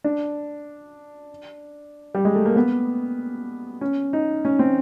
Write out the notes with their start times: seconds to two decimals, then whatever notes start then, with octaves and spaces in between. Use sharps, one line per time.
0.04 D4
2.15 G3
2.25 G#3
2.35 A3
2.45 A#3
2.56 B3
3.81 C#4
4.13 D#4
4.45 C#4
4.59 C4